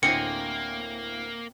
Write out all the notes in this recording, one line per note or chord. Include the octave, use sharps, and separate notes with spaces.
D2 A2 A#3 C4 D#5 G#5 C#7